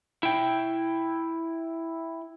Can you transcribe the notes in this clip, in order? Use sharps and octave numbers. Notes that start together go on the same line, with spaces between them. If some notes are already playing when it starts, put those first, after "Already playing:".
E4 G5